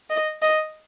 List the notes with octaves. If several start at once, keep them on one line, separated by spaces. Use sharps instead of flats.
D#5
D#5